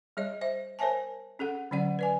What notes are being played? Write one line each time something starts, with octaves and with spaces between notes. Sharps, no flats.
G3 G#4 C#5 D#5
C5 E5
A#4 C5 C#5 E5 G#5 A5
C#4 G#4 A4 F#5
D3 F#3 C#4 D5 F#5
B4 D5 G#5